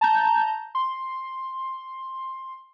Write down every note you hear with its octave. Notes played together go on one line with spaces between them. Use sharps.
A5 A#5 G6
C6